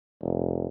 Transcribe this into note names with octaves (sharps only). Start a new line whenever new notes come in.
F1